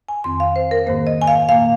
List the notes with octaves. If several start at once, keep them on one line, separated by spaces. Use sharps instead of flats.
G#5
F2 D#3 C4 C6
F5
C5
A#4
G#2 D#3 A#3 C5
D#5
G#5
F5
A#2 A#3 F5